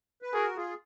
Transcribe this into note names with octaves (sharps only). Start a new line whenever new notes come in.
B4
F#4 G#4 A#4
F4 G#4